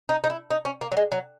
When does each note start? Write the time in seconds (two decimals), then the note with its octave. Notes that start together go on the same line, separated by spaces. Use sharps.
0.09 D#4
0.24 D#4
0.30 E4
0.50 D#4
0.65 C#4
0.81 A#3
0.92 F#3
0.97 G#3
1.12 F#3